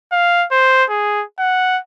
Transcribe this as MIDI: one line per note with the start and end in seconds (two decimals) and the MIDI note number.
0.12 0.46 77
0.51 0.84 72
0.90 1.24 68
1.39 1.79 78